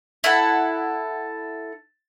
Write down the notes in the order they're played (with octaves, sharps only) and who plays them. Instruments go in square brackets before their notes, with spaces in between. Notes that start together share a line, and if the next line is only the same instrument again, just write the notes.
[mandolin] E4 A4 F#5